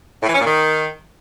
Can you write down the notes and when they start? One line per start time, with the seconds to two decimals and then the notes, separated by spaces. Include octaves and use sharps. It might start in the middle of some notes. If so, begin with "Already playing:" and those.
0.23 A2
0.29 E3
0.34 C#4
0.40 A#2
0.45 D#3